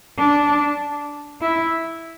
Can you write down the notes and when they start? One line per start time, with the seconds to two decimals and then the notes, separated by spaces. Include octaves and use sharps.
0.18 D4
1.41 E4